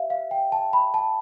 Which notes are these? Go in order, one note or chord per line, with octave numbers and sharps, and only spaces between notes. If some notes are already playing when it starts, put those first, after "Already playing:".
Already playing: G4 C5 E5 F5
F5
G5
A5
B5
A5